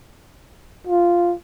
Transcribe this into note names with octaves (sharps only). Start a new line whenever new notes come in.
F4